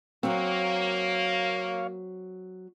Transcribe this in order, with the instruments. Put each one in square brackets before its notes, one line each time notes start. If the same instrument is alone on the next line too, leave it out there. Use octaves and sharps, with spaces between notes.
[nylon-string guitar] F#3 C4 [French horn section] A#3 [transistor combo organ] C#5 F5